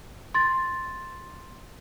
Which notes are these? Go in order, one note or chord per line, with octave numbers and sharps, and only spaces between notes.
C6 A6